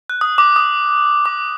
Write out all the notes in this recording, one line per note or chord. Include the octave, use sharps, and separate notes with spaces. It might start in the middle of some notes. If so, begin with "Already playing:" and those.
F#6
D#6
D6
D#6
D6